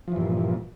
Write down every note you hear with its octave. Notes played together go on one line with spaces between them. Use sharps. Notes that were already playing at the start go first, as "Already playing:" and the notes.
G2 A#2 E3 F3